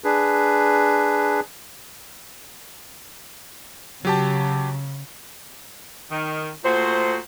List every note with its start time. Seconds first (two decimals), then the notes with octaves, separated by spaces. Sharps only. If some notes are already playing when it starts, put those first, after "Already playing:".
0.04 D4 G#4 B4
4.05 C#3 F#3 G4 A5
6.10 D#3
6.63 A#2 A3 F#4 C5